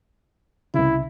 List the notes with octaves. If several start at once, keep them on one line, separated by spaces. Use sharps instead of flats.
C2 C#3 E4